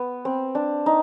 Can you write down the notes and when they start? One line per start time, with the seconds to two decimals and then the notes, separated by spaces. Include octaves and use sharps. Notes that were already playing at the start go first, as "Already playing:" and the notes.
Already playing: B3
0.25 C4
0.55 D4
0.86 D#4